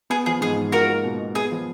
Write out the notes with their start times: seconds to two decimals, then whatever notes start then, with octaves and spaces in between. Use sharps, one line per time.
0.10 B3 G#4
0.26 F3 G#4
0.41 G#2 G#4
0.58 G#2
0.72 F4 F#4 A#4
0.88 A#3
1.04 B2
1.19 B2
1.35 B3 G#4
1.51 F3